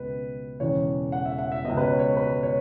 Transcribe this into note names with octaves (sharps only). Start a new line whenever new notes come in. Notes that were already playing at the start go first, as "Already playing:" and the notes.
Already playing: C#2 B2 B4
E1 E2 C#3 C#5
F#5
E5
F#5
E5
C#2 B2 D#5
B4
C#5
C#5
B4
C#5